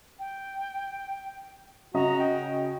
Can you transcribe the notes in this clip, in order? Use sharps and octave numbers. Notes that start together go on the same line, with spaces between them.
G5
C#3 F#4 D#5 A#5
G5